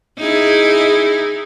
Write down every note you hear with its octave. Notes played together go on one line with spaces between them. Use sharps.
D#4 E4 G#4